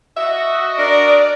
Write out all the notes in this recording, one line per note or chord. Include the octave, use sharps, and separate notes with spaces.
F#4 D#5 E5
D4 A#4 D5